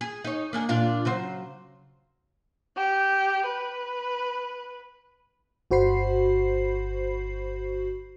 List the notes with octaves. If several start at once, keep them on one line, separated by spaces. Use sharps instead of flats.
G#4
D#4 C#5
A#3 D4 G#4
A#2 D4 F4
C#3 F#3 C5
G4
B4
G1 F#4 C5 B5 C7